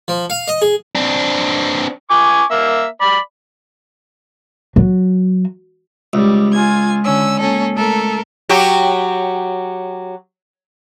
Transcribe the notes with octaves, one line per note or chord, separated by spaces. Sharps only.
F3
F5
D#5
G#4
C4 D4
G#5 C#6 D6
A#3 E5
D5 B5
F#3
C#2 G3
F4 G#5 G#6
D3 C#4 E6
A#3 C#4 A4
A3 A4 A#4
F#3 F#4 G4